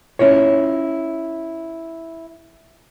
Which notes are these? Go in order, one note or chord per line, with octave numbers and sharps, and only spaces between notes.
C#4 E4 F4 C#5